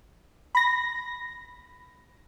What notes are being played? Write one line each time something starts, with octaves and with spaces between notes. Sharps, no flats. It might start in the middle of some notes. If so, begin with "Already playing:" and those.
B5 A#6